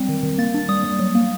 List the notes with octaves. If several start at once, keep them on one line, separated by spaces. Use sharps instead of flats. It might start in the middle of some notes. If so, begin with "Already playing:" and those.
Already playing: F#3 G3 C4
D#3
D#3
A#3 A6
D4
G3 D#6
G3
F#3
A#3